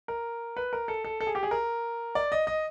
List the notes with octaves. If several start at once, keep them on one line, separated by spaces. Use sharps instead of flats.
A#4
B4
A#4
A4
A4
A4
G#4
G4
G#4
A#4
D5
D#5
D#5